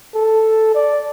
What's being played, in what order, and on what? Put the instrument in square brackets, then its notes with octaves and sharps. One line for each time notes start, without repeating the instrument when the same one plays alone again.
[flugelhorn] A4
D5